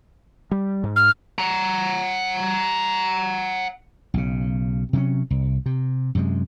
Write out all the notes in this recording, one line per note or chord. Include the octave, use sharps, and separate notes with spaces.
G3
G#2
F6
F#5 A#5
B1 C#3
C3 F#3 C#4
C2
C3
F#2 C3 G#3